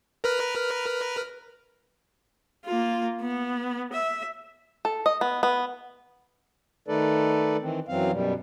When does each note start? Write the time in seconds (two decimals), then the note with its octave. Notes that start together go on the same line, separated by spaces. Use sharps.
0.24 A#4 B4 F6
2.65 A#3 F4
3.21 B3
3.93 E5
4.85 A4
5.06 D#5
5.21 B3
5.43 B3
6.88 D#3 A3 D#4 A4 B4 D5
7.61 D#3 E3 C4
7.88 F#2 E3 F#3 C4 F5
8.12 F#2 B2 G3